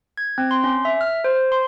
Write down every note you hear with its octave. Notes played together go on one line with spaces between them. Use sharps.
G#6
C4
C6
C#4
E5
F6
C5
C6